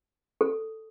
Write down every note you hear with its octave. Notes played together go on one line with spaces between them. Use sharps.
A4